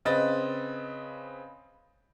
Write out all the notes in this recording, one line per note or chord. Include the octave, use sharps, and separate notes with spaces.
C#3 C4 B4 D#5 A6